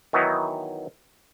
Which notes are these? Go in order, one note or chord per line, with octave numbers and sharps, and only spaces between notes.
D#3 E3 F#3 B3 D#4 E4